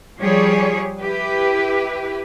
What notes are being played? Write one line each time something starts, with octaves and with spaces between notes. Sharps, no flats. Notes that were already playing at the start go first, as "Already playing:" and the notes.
F3 G3 G4 G#4 C#5
E4 G4 B4